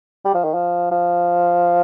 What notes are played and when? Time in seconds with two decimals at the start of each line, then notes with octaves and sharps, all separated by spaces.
0.25 G3
0.34 F3
0.44 D#3
0.54 F3
0.91 F3